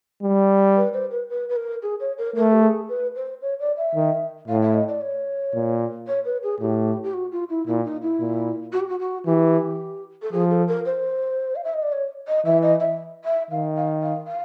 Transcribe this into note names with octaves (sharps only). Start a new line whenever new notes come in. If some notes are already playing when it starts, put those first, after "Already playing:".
G3
B4
C5
B4
B4
B4
A#4
G#4
C#5
A#4
A3 A#4
G4
G#4
B4
C5
C#5
D5
E5
D#3
A2 F5
E5
D#5
D5
C#5
A#2
C#5
B4
G#4
A2 G4
G4
F#4
F4
E4
A#2 E4
D#4
E4
A#2
F#4
G4
F#4
F#4
E3 G4
A4
F3 G#4
A4
A#4
C5
F5
E5
D#5
D5
C#5
D#5
E3 E5
D#5
E5
E5
D#3 F5
F5
F5
F5